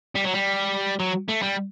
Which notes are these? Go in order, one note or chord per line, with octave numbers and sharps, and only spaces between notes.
G3
F#3
G3
F#3
A3
G3